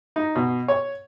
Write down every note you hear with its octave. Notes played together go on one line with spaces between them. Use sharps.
D#4
B2
C#5